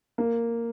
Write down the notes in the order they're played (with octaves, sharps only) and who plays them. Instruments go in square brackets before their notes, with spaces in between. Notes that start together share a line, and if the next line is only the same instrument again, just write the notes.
[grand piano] A#3